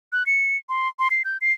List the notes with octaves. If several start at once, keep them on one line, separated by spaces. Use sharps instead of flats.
F#6
C#7
C6
C6
C7
G6
C7